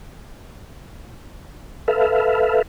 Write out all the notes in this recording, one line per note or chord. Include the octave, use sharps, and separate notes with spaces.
A4 B4 E5 F5